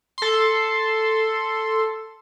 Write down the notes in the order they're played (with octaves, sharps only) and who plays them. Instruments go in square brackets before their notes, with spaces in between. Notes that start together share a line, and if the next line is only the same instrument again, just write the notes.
[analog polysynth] A4 C6